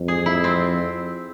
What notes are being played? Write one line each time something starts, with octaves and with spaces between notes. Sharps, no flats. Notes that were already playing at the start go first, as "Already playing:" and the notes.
Already playing: F2
G#4
E4
C4